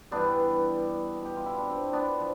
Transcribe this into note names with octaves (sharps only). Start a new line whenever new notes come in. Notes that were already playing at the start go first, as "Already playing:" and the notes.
G2 E3 G3 B3 D4
B2 G3
G4
F4
E4
D4
C4
B3 D4
F3